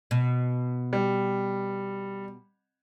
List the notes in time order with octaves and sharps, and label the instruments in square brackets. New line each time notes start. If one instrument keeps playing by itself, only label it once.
[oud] B2
[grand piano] G3